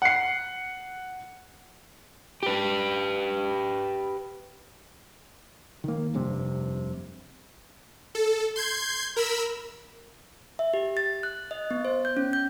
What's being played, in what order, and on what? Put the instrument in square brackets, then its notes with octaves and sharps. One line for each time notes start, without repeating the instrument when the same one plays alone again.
[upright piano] F#5 C7
[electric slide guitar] G4 B4
[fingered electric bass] D#3 A#3
F1 G2 C3
[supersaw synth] A4
C6 G6 G#6
A#4 B5 E6
[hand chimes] E5
G4
A6
F#6
D#5
B3
C5
G6
C#4
G6